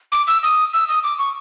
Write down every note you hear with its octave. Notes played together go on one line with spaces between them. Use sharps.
D6
E6
D#6
E6
D#6
D6
C#6